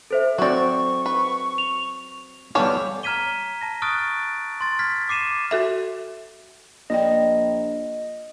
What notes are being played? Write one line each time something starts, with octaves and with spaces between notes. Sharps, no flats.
A4 C5 E5
F#3 C4 F#4 D5 C#6
B4
F7
G3 B3 A4 C#5 F5 G#5 D6
A#5 F6 G#6 B6 D#7 G7
A5 A#6
C#6 D#6 F6 F#6 A6 D7
C6 A6
F6 G#6 B6
D6 C7 D#7 E7
F#4 A4 E5
A#1 A#3 D5 D#5 G5